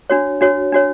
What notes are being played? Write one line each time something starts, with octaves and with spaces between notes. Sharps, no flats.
D4 F#4 C#5
D4 F#4 C#5
D4 F#4 C#5